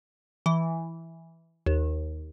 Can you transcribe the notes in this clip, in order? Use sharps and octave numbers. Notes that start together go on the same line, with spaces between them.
E3
D#2